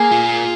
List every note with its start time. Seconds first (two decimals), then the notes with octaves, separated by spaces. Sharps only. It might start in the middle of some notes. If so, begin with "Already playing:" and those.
Already playing: A#3 G#4
0.11 F4